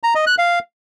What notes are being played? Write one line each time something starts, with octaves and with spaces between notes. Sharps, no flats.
A#5
D#5
F#6
F5